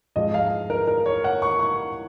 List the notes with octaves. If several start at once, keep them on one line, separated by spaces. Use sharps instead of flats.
G#2 F3 G#3 D#5
F5
A#4
A#4
C#5
F#5
C#6
C#6